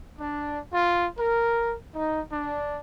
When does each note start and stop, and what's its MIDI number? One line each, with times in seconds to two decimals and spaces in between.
0.18 0.58 62
0.72 1.04 65
1.18 1.73 70
1.93 2.19 63
2.31 2.80 62